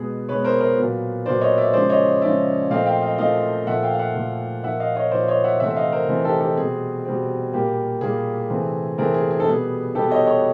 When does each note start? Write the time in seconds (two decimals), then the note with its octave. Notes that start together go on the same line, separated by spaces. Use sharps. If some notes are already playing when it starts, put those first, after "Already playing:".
Already playing: B2 G#3 B3 G#4
0.29 B2 G#3 B3 B4 C#5
0.44 A#4 C5
0.61 A#4 C5
0.78 A#2 F#3 B3
1.26 A#2 F#3 B3 C5 D5
1.41 C#5 D#5
1.57 D5 E5
1.73 C#3 F3 G#3 C5 D5
1.90 C#5 D#5
2.22 C#3 F3 G#3 D5 E5
2.70 A#2 F3 A3 C4 D#5 F5
2.86 F5 G5
3.02 D#5 F5
3.18 A#2 F3 A3 C4 D#5 F5
3.67 A#2 F3 A3 E5 F#5
3.83 F5 G5
3.94 F5
3.99 E5 F#5
4.15 A#2 F3 A3
4.63 A#2 F3 A#3 E5 F#5
4.80 D#5 F5
4.96 C#5 D#5
5.11 A#2 F3 A#3 C5 D5
5.28 C#5 D#5
5.44 E5 F#5
5.60 C3 E3 A3 C4 E5 F#5
5.71 E5
5.76 D#5 F5
5.92 A#4 C5
6.08 C3 E3 A3 C4
6.25 G4 A4
6.40 G4 A4
6.57 B2 G3 C4 G#4
7.05 B2 G3 C4
7.53 A#2 G3 A#3 G4
8.01 A#2 G3 A#3 G#4
8.50 C3 E3 A3 C4
8.98 C3 E3 A3 C4 G#4 A#4
9.14 G#4
9.31 G#4
9.40 A4
9.46 B2 G3 B3 G#4
9.95 B2 G3 B3 G4 A4
10.11 C#5 D#5
10.27 C#5 D#5